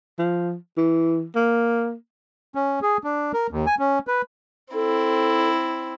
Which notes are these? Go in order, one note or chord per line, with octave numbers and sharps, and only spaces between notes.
F3
E3
A#3
C#4
G#4
D4
A#4
D#2
G#5
C#4
B4
C4 E4 A4